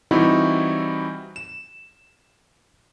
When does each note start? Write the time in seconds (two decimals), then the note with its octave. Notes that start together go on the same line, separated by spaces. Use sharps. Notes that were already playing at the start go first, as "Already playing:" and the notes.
0.11 E3 G3 C4 D#4 E4 F#4
1.36 E7